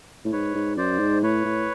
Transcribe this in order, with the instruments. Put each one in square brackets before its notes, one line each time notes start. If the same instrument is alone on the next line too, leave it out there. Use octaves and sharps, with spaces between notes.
[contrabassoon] A2
[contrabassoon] G#2 [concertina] B4 C#5
[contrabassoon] G#2
[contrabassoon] F#2 [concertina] C5 D5
[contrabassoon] G#2
[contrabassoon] A2 [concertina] B4 C#5
[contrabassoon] A2